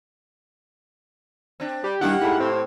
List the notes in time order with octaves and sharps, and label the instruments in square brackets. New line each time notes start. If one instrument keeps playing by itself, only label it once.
[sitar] C4 D4
[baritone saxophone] G3 [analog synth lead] G4
[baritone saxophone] D#3 [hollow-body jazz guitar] G3 D4 E4 [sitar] A#3 G4 [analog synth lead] F#5
[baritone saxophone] G#2 [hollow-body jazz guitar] E4 A4 B5
[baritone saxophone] A2 [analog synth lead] C4